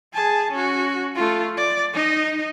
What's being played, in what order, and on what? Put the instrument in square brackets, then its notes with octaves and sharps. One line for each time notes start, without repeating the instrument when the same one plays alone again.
[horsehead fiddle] G#4 A5
C#4 F#4
A3 F4
D5
D#4 D#5